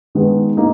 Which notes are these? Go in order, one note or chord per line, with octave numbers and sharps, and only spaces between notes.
D#3 G#3 B3
A#3 D#4